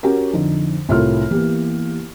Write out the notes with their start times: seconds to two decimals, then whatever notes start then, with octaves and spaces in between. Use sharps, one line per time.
0.03 C#4 F#4 G4 A#4
0.34 F2 D3 D#4
0.89 C2 A2 F4 A4 A#4 F6
1.31 E3 A#3 B3 E4 G4